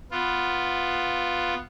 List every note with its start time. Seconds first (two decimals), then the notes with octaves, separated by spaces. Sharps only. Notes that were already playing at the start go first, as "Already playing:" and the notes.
0.11 B3 F4